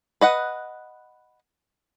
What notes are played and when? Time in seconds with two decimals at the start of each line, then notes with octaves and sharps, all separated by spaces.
0.21 B4 D#5 F#5